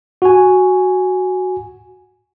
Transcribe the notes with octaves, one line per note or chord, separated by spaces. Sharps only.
F#4 G#5